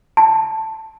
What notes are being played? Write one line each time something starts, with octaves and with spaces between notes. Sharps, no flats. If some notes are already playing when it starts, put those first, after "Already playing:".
A5